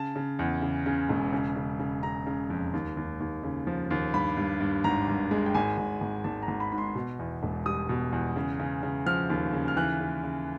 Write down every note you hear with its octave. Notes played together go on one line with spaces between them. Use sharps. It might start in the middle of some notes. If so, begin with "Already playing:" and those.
Already playing: C#3 A5
C#3
E2
C#3
C#3
E1
C#3
C#3
C#3
C#3 A#5
C#3
F2
D#2
D#2
D#2
C#3
F3
D#2
G2 B5
G2
G2
G#1 A#5
G2
G#3
G5
G#1 G#5
G#1
G#1
G#1 A5
A#5
G#1
B5
G#2 B5
C6
B2
E2
E1
G3 D#6
B2
E2
C#3
C#3
C#3
F3 F6
D#2
C#3
F6
E3 F#6
C#3
C#3